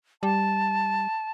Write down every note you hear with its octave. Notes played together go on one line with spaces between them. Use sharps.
G3 A5